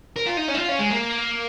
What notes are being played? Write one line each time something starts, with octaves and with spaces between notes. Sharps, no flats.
A#4
F4
D#4
C#4
D#4
F4
C#4
G#3
A#3